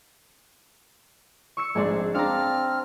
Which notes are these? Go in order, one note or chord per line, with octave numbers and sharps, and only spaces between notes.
C#6 E6 C#7
A#1 G#2 C4 D4 G#4 D5
C4 D4 F5 A5 A#5 F6